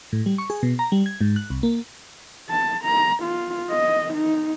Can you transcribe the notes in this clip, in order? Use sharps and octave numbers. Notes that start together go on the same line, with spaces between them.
A2
G3
C#6
G#4
B2
A#5
G3
G#6
G#2
F#6
C2
A#3
A5
A#5
F4
D#5
D#4